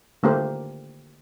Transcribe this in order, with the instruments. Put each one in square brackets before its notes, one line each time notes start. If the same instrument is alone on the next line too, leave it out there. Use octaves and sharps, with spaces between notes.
[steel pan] D3 A3 A#3 G4 C5